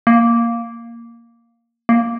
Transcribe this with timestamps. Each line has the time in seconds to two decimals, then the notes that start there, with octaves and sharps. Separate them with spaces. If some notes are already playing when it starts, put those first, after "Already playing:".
0.07 A#3
1.89 A#3